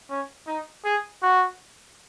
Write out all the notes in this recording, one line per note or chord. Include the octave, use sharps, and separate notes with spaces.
C#4
D#4
G#4
F#4